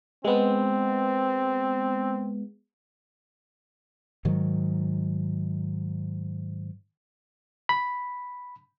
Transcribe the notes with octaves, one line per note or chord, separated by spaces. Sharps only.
G#3 B3 C4
G#2 D#3 F#3
B5